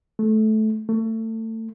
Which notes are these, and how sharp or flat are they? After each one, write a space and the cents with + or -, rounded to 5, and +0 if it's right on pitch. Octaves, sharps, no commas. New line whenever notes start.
A3 -20
A3 +25